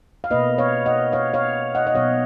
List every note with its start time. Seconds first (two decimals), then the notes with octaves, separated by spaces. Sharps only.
0.24 F5
0.30 B2 A#3 B4 D#5
0.58 C#5 F5
0.86 D#5 F#5
1.12 C#5 F5
1.34 C#5 F5
1.75 D#5 F#5
1.87 D#5
1.95 B2 F#3 B3 C#5 F5